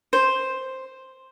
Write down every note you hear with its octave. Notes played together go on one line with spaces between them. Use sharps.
C5